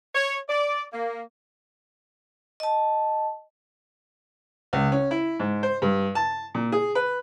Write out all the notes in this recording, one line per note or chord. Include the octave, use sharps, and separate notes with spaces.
C#5
D5
A#3
D#5 A5
C#2
C#4
E4
G#2
C5
G2
A5
A#2
G#4
B4